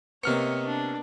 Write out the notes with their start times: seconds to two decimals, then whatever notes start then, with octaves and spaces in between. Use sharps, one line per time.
0.24 C3 A#3 B3 C#5 D#5 F6 C#7
0.66 D4